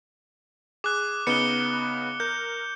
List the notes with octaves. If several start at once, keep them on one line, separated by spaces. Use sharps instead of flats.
G#4 D6 F#6
C#3 B3 D#4 C#7 G7
A#4 G6